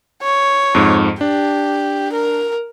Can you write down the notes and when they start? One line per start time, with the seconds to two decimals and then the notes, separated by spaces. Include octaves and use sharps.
0.23 C#5
0.75 F2 G#2
1.21 D4 G4
2.13 A#4